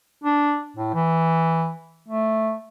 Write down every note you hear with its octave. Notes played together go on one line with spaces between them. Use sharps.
D4
A2
E3
A3